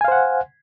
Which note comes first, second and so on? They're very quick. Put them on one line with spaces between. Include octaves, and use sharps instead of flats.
G#5 F5 C5 F#5